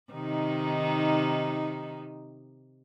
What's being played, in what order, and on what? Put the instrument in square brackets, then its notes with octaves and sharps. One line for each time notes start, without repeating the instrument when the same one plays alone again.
[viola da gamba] C3 D#3 D#4